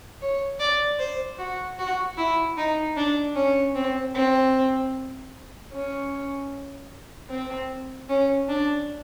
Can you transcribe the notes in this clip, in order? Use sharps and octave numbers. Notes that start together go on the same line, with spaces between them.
C#5
D5
C5
F#4
F#4
E4
D#4
D4
C#4
C4
C4
C#4
C4
C#4
D4